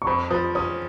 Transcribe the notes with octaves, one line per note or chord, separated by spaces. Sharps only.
C#6
F2 B5
F3 D#6
C#4 D#6